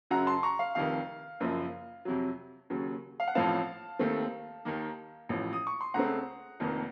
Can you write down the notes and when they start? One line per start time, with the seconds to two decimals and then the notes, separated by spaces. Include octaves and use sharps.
0.10 F#2 C#3 F#3 F#5 A#5
0.27 A5 C6
0.43 A#5 C#6
0.59 F5
0.75 F1 F2 C3 D#3 F5
1.40 F#1 F#2 F3 A#3
2.05 F2 C3 F#3
2.70 D#2 C#3 F#3
3.20 F5
3.28 F#5
3.35 A1 A2 F3 C4 F5 A5
3.99 D#2 D#3 A3 C4
4.65 D#2 D#3 A#3
5.29 A1 A2 F3
5.53 D#6
5.67 C#6
5.81 C6
5.94 C#2 C#3 A3 C4 F#5 A#5
6.60 F1 F2 D#3 A#3